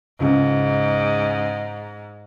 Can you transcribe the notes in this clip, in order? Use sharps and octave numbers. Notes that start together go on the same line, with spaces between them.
C#2 G#2 C#3